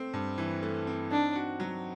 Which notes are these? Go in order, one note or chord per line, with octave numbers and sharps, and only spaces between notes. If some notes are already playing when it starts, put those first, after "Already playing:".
Already playing: A3 C4
G2
E3
A3
C4
D4 D#4
F#4
F#3